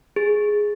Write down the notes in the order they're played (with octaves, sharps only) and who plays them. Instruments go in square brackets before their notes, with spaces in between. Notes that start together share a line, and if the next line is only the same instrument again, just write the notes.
[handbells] G#4